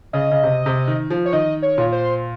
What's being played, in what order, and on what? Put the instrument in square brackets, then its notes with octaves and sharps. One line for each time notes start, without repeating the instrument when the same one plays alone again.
[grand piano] C#3 [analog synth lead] D#5
[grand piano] C#3
C3
C3
D#3
F3
[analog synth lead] C#5
[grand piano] D#3 [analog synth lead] D#5
[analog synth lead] C#5
[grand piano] A#2
[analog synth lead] C5